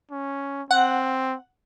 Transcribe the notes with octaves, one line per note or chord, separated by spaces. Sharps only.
C#4
C4 F#5